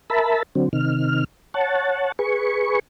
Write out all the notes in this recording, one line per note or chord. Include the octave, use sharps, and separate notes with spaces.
A#4 E5 A5 B5
D3 F#3 C4
C3 D#3 F6
C#5 F#5 A5
G#4 B4 C#6